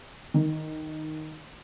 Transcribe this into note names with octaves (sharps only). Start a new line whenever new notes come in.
D#3